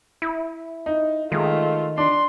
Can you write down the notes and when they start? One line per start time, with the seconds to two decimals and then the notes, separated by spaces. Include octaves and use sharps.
0.22 E4
0.86 D#4
1.32 D#3 G#3 A3 F4
1.98 D4 C6